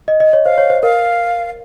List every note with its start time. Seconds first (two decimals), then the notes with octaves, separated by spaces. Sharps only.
0.08 D#5
0.20 D#5
0.33 C#5
0.45 C5 F5
0.58 C#5
0.70 C5
0.83 A#4 F5